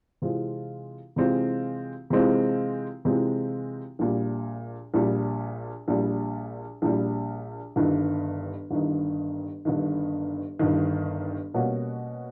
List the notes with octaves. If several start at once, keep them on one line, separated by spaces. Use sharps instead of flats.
C3 E3 G#3 C4 F4
C3 E3 G#3 C4 F4
C3 E3 G#3 C4 F4
C3 E3 G#3 C4 F4
A#1 A#2 G3
A#1 A#2 G3
A#1 A#2 G3
A#1 A#2 G3
G1 G2 D#3
G1 G2 D#3
G1 G2 D#3
G1 G2 D#3
B2 G3 A#3 C#4 F#4